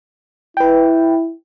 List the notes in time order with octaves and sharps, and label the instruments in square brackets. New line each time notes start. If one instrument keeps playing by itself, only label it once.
[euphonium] E4 [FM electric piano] B4 G5